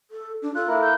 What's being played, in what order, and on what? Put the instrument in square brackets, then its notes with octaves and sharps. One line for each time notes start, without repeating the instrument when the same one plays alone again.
[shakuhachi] A4
D4
[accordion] F4 [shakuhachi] A4 [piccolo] F#6
[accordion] A#3 E4 A#4
[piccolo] G6